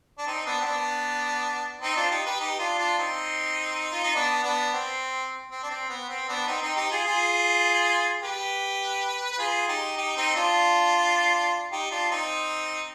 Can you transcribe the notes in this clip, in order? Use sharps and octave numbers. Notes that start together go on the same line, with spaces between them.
D4
C4 D#4
B3 D4
C4
B3 D4
C4 D#4
D4 F4
D#4 G4
G4 B4
D#4 G4
D4 F4
D4 F4
C4 D#4
F4
D#4
B3 D4
B3 D4
C4
C4
D4
C4
B3
C4
B3 D4
C4 D#4
C4 D#4
D#4 G4
F4 G#4
F4 G#4
G4 B4
B4
F4 G#4
D#4 G4
D#4 G4
C4 D#4
D4 F4
D#4 G4
D4 F4
C4 D#4